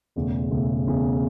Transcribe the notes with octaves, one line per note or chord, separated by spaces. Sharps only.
E1 E2 C#3 A3
E1 E2 C#3 A3
E1 E2 C#3 A3